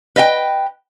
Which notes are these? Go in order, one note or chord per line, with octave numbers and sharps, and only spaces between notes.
B4 D#5 E5 G5